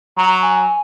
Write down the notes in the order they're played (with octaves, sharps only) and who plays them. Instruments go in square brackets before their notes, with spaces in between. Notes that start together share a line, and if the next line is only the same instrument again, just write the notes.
[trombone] F#3 [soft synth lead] A#5
[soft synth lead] G#5